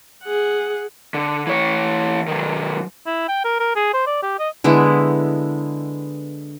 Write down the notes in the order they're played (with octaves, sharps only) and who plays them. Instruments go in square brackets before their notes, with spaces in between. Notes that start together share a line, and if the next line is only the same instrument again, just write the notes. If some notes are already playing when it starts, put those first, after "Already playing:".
[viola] G#4 F#5
[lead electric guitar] D3
E3 C#5
D#3 F#3
[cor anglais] E4
G5
A#4
A#4
G#4
C5
D5
G4
D#5
[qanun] D3 G#3 B3 E4